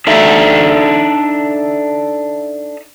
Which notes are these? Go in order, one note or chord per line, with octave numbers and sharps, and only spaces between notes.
D4 D#4 A4 E5